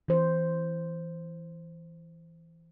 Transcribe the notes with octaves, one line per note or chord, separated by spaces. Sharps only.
E3 C5